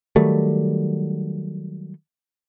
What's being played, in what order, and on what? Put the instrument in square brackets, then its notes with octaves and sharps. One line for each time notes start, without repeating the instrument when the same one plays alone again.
[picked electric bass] D#3 F#3 G3 A3